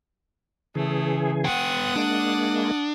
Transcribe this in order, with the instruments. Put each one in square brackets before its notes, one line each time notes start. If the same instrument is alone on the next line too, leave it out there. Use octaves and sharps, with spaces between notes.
[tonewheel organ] C#3 E3 G#4 [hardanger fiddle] A3
[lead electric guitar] B3 G5 [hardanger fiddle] F#5 D#6
[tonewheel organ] G#3 A#3 [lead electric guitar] D4